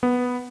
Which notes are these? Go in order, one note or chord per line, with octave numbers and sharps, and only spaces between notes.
B3